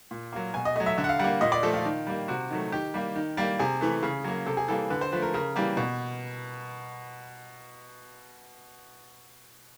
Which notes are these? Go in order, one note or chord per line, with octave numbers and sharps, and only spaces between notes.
A#2
F#3 A#3
B2 G#5
D#5
F#3 A3 D#5
E5
D3 E5
F#5
F5
G3 A#3 F#5
A#2 D#5
D5
F3 A3 A4
F4
D#3
G3 A#3
C3 F#4
D#3 F#3 A3
D#3 G4
G3 A#3
D#3
G3 A#3
C3 G#4
E3 A3
C#3
F#3 A#3
C3 A4
G#4
E3 G3 A#3 A4
D3 B4
C5
F3 A3 B4
A#4
C#3 A#4
E3 G3 A#3
B2